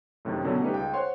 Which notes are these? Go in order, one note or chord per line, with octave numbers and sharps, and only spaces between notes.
F#2 A2 C3 D#3
B2 D3 F#3 B3 C#4
G3 A3 C#4 D#4 G4 B4
C#2 G5
C5 C#5 F#5 C6